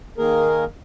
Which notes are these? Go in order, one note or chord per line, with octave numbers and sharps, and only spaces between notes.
D#3 A#3 G#4 A#4